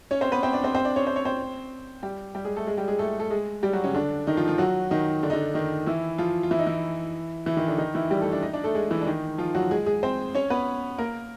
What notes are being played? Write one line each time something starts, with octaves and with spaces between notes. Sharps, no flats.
C#4 C#5
C4 C5
B3 B4
C4 C5
D4 D5
C4 C5
C4 C5
D4 D5
C#4 C#5
C5
C#5
C4 C5
G3 G4
G3 G4
G#3 G#4
A3 A4
G#3 G#4
G3 G4
G#3 G#4
A3 A4
A3 A4
G#3 G#4
G3 G4
F#3 F#4
C#3 C#4
D3 D4
D#3 D#4
F3 F4
F3 F4
F#3 F#4
D#3 D#4
D3 D4
D#4
D3 D4
D#3 D#4
E3 E4
F3 F4
F4
E3 E4
D#4
E3 E4
E3 E4
D#3 D#4
D3 D4
D#3 D#4
E3 E4
G3 G4
A3 A4
D4 D5
D#4 D#5
D4 D5
A3 A4
G#3 G#4
E3 E4
D4
D#3 D#4
F3 F4
F#3 F#4
G#3 G#4
G#3 G#4
C4 C5
C#4 C#5
B3 B4
A#3 A#4